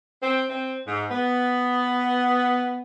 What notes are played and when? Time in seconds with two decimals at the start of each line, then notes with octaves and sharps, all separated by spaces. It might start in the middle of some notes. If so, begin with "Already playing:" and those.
0.23 C4
0.50 C4
0.87 G#2
1.11 B3